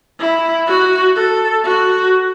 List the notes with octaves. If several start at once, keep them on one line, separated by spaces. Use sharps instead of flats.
E4
F#4
A4
F#4